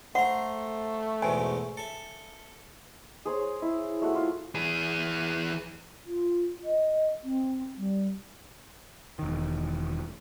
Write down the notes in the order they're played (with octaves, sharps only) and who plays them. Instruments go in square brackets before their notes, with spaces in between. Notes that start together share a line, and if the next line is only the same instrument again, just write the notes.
[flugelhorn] A3 [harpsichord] C5 A#5 [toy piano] F#5
[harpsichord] E2 G#2 B2 [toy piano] G#5
[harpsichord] A4 E5
[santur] G#4 C5 C#5
E4
A3 F#4 F#5
F4
[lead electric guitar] E3 G#4
[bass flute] F4
D#5
C4
G3
[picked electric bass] E1 D#3